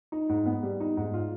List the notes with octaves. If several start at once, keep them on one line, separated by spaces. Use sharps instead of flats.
D#4
G#2
B3
G3
D#4
G#2
F4